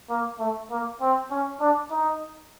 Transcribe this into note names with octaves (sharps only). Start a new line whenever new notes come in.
A#3
A3
A#3
C4
C#4
D4
D#4